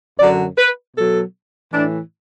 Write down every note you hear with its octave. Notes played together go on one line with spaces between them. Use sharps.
F#2 D3 F#3 D5
B4
B2 F#3 A4
A2 E3 D4